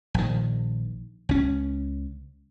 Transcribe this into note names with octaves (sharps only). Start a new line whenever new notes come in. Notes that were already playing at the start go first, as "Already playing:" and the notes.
A#1 D#3
C#2 C#4